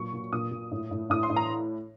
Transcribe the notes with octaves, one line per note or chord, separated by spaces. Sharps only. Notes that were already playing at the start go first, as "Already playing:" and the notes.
Already playing: A#2 F#3 C#6
A#2
A#2 D#6
A#2
A2
A2
A2 D#6
C6
A2
A#5